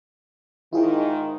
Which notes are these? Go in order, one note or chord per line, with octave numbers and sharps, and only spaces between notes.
G#2 D#3 E4 F4 G#4